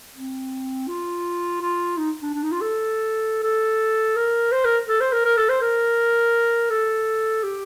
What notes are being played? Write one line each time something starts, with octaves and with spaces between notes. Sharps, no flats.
C4
F4
F4
D#4
D4
D4
D#4
F4
A4
A4
A#4
C5
A#4
A4
C5
A#4
A#4
A4
C5
A#4
A4
G4